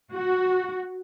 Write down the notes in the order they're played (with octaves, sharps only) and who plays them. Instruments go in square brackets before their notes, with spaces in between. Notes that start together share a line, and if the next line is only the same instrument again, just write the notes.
[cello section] F#4